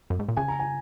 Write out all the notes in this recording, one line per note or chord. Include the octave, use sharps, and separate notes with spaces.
F#2
G#2
A#2
C#3 G#5
A#5
G#5